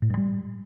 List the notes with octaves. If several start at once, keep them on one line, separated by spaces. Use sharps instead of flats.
A2
G2
G3